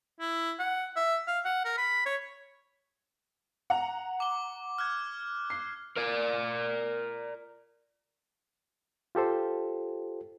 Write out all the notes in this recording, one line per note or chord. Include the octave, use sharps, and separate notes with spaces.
E4
F#5
E5
F5
F#5
A#4
B5
C#5
F#5 A#5
D6 G7
F6 F#6 G#6
C7
A#4 D5
F4 G4 A4 C5